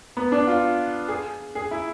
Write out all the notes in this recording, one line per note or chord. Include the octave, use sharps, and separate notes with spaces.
B3
D4
F4
G#4
G#4
E4